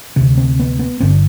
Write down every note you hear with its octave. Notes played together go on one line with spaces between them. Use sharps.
D2 C3 C4
C4
B3
B3
G1 G2 D3 C4
D4